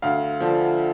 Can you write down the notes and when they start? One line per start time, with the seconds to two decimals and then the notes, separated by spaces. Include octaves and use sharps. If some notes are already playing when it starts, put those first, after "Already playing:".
0.02 D2 F5
0.40 D3 F3